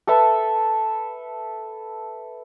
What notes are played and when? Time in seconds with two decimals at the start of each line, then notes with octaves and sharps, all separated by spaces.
0.07 A4 B4 E5 A5